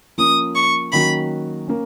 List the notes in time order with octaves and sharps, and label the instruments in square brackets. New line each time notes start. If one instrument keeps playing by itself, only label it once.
[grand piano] F3 A#3 C#4 [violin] D#6
[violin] C#6
[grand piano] D#3 F#3 A#3 C#4 F#4 [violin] B5
[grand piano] A#3 C#4